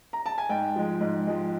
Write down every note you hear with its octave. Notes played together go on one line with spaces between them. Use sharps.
A#5
A5
G#5
G#2 G5
F3 G#3
G#2
F3 G#3